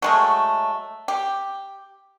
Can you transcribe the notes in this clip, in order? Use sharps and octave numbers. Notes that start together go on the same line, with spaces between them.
F#3 G#3 A3
G4